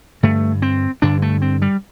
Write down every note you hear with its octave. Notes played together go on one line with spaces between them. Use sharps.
G2 D3 A3
C4
G2 D3 D4
A3
C4
G3